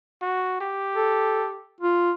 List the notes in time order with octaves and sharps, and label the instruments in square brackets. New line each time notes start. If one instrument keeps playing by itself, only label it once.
[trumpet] F#4
G4
[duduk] A4
F4